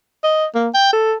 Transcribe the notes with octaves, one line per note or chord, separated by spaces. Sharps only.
D#5
A#3
G5
A4